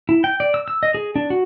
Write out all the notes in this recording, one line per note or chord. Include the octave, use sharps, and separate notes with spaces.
E4
G5
D5
E6
E6
D#5
G#4
D4
F#4